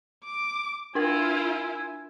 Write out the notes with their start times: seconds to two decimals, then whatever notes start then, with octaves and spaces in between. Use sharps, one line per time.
0.24 D6
0.95 D4 E4 F4 A#4 G#5